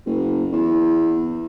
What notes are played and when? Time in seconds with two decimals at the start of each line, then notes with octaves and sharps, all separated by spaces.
0.06 F#1
0.52 E2